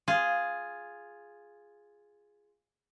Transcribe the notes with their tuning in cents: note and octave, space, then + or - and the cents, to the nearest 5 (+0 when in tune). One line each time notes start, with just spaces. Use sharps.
F4 +0 G#4 +0